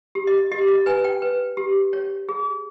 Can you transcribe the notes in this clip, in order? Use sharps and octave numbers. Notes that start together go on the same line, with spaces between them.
G4
D#5
G4 D#5
D#5
B4 G#5
G5
B4
G4
C#5
G#4